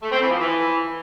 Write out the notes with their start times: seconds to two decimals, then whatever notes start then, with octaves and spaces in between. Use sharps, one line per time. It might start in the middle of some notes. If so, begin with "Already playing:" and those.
0.02 A3
0.11 C4
0.20 E3
0.30 F3
0.39 E3